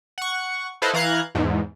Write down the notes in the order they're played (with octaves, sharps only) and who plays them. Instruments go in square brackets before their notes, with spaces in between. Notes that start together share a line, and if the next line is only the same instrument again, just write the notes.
[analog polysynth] F#5 C#6
E4 A4 B4 C5 D#5 F5
E3 F5 A#5 F#6 G#6
E2 G#2